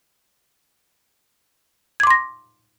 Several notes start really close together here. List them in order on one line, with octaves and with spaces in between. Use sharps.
G#6 D6 C6 A#6